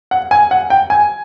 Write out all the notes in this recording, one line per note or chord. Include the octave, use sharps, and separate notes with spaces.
F#5
G#5
F#5
G5
G#5